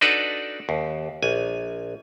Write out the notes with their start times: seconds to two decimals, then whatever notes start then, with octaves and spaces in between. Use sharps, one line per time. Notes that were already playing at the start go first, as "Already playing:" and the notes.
0.01 D4 D#4 F#4 A4 B4 D5
0.69 D#2
1.23 A#1 G#5